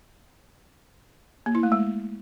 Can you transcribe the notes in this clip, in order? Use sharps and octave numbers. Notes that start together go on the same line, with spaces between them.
A#3
E4
A3
G#3